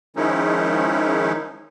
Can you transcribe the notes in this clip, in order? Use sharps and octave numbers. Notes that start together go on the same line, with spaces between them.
D#3 F3 G#3 C#4 D#4 E4